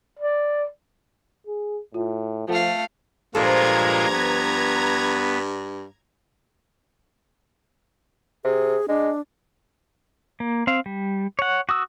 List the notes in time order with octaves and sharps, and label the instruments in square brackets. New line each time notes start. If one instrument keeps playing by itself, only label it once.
[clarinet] D5
[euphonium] G#4
[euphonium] A2 [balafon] F4
[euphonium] F3 [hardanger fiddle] A3 F5 [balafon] F4 A4 F#5
[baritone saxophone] G2 [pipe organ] A#2 G#3 F4 [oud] F3 A4 [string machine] A#5 G#6
[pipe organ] B3
[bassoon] C3 [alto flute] G#4
[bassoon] G#3 [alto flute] D4
[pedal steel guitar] A#3
C4 F5
G3
C#5 F#5
F#4 D#6 E6